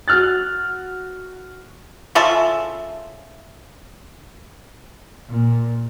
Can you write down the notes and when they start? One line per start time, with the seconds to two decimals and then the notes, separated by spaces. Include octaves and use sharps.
0.08 F#4 F6 F#6 A6
2.15 C#3 F4 A4 E5
5.30 A#2